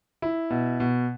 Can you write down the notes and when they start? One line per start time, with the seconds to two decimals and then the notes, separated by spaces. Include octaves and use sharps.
0.22 E4
0.50 B2
0.80 B2